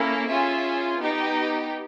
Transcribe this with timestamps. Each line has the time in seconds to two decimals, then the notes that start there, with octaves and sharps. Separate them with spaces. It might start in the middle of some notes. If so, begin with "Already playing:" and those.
Already playing: A#3 C#4 E4 A4
0.28 C#4 F4 G#4 E5
0.98 B3 D#4 G4